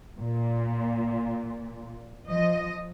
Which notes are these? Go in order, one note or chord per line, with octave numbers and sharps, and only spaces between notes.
A#2
F3 D#5